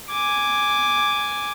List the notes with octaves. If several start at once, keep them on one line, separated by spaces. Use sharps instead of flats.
G#5 D6